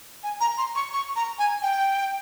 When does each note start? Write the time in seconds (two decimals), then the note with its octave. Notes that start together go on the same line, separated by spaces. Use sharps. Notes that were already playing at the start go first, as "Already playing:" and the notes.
0.23 G#5
0.41 A#5
0.58 C6
0.76 C#6
0.93 C#6
1.16 A#5
1.39 G#5
1.62 G5